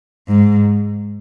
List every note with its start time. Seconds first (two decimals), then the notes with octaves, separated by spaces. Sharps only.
0.27 G#2